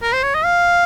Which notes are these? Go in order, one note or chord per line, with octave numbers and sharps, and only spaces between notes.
A#4
C5
C#5
D#5
F5